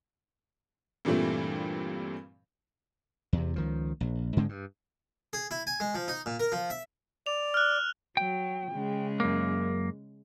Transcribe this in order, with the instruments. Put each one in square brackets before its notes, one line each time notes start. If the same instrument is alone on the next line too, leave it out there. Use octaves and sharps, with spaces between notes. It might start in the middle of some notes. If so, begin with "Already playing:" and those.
[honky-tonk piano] G2 A#2 E3 G3 A3 C4
[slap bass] E2 C3
C#2 D#3 F3
A#1
G#2 D3 G#3 C4
G2
[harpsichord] G#4
E4
G#5
G#3
F3
D#4
A#2
A#4
F3
E5
[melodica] D5 [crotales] F7
[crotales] F6 F#6
[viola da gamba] F#3 [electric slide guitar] G5
[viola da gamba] C#3 G#3
[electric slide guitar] F#2 A#3